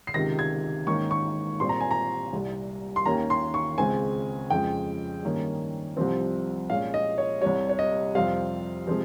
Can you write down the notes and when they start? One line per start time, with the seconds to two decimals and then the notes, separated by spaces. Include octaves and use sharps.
0.07 C7
0.14 C#2 C3 D#3 A#6
0.39 G#6
0.87 G#2 D#3 A#3 C#4 C#6
1.11 C#6
1.60 A#2 G3 C4 C6
1.69 A#5
1.80 G#5
1.91 A#5
2.33 C2 C3 G3
2.96 C6
3.05 D#2 D#3 A#3 C#4 A#5
3.30 C6
3.54 C#6
3.78 C#2 C#3 G#3 C4 G#5
4.50 F2 C#3 G#3 G5
5.23 G2 D#3 A#3 C#4
5.97 C2 C3 F3 C4
6.70 A#2 G#3 C#4 F5
6.94 D#5
7.18 C#5
7.41 C2 C3 G3 C#5
7.69 C#5
7.79 D#5
8.15 F2 C3 G3 C4 F5
8.87 C3 F3 G#3 C4